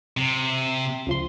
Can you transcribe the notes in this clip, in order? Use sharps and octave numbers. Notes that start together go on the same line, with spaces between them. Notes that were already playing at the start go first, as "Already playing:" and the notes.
C3
C#2 F3 C6